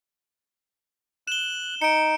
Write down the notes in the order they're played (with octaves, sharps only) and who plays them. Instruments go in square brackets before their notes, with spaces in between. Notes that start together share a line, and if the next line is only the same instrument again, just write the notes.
[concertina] F#6 [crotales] E7 G7
[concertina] D#4 [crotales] C#7 D7